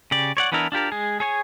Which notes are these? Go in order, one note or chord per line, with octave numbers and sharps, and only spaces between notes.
C#3 G4 D5
C#5 D5 F#5
E3 B3 D4 E4 A#4
D4 F4 G4 A#4
G#3 G#4
G#4 C#5 G#5